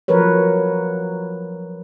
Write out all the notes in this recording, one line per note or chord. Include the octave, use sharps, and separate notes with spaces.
F3 F#3 A#4 B4 C#5